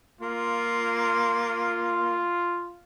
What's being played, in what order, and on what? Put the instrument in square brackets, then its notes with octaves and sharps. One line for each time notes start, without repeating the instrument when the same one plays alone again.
[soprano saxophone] A#3 [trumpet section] F4